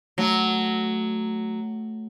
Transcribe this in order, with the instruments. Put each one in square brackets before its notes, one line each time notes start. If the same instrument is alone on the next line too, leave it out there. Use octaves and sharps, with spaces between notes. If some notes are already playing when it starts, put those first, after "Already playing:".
[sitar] F#3 [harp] A3